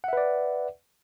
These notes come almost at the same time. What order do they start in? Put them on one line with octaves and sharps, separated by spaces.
F#5 E5 B4 D5